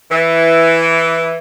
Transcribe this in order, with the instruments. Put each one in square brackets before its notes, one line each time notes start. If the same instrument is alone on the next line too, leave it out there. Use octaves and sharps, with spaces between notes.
[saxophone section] E3